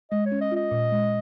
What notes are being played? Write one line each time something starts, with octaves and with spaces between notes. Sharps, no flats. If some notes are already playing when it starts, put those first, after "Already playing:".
G#3 D#5
C#5
C#4
D#5
F4 D#5
A#2
G#3